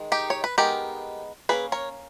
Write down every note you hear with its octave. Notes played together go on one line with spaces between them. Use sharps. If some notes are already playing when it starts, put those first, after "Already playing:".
Already playing: D#3 G#3
D#4 G4
C#5
B4
G#3 B3 D#4 G4 A#4
G3 A#3 C#4 G#4 B4
A#4 C#5